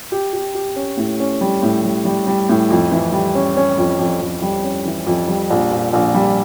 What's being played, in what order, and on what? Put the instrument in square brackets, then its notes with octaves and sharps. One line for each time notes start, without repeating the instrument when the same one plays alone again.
[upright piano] G4
G4
G4
C#4
A2
C#4
G3
A2
G3
G3
G3
A2
F2
E3
G3
C#4
C#4
F2
F2
F2
G3
C#4
E3
F2
G3
A#1
A#2
A#1
G3